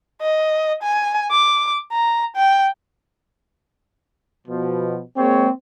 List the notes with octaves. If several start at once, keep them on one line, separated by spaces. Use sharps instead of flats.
D#5
G#5
D6
A#5
G5
B2 F3
G#3 A#3 C4 C#5